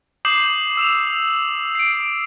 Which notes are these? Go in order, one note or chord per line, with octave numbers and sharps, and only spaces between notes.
D6 D#6 G6 C7 E7 F#7
E6 E7 F7
C7 D7